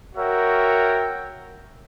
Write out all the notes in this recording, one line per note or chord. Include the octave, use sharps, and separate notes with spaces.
F#4 A#4 C#5 E5 G5